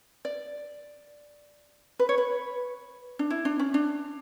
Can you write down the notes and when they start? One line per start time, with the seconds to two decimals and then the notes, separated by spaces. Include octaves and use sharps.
0.25 D5
1.99 B4
2.09 C#5
2.18 B4
3.19 D4
3.30 E4
3.45 D4
3.59 C#4
3.74 D4